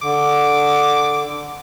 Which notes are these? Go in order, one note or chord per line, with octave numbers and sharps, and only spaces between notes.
D3 D6